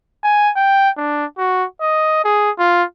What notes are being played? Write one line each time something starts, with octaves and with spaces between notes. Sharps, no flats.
G#5
G5
D4
F#4
D#5
G#4
F4